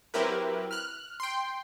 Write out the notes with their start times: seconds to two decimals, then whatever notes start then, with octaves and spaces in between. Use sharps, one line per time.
0.14 F#3 C4 E4 G4 A#4 B4
0.71 F6 F#6
1.20 G5 C6